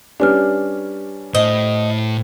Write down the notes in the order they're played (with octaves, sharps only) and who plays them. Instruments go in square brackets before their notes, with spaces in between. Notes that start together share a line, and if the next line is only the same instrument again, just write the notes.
[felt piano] G3 C#4 D4 [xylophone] G4 B4 F6
[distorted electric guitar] A2 [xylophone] C5 [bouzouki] D#5